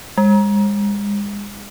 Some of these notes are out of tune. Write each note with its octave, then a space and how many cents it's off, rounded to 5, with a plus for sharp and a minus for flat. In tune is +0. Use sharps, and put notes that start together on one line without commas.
G#3 -35